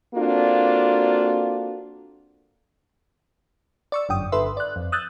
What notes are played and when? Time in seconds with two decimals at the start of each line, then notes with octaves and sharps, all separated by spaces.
0.15 A#3 C4 D4 F4 F#4 A4
3.92 D5 C#6 E6
4.09 G1 F#2 G5 D#6
4.32 G1 A4 B4 E5 C6
4.57 D5 F#6
4.76 F2
4.92 D#6 E6 F#6 G6 A6